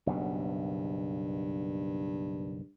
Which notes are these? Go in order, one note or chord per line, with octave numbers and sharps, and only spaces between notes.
F#1 B1 G2 B2